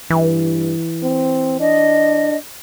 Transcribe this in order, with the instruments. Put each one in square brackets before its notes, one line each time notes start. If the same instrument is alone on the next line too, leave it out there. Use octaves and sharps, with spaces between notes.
[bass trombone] G2 [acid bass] E3
[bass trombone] C4
[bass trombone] D4 [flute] D#5